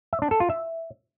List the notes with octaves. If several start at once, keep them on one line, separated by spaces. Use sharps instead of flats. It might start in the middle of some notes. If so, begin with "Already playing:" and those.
E5
D4
A4
F4
E5